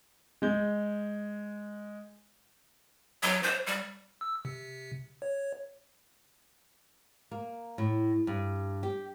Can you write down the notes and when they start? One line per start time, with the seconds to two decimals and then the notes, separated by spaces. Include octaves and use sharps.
0.42 G#3 G6
3.23 F#3
3.43 C5
3.66 G3
4.21 E6
4.45 C3
5.22 C#5
7.31 A#3
7.78 A2
8.27 G2
8.83 G4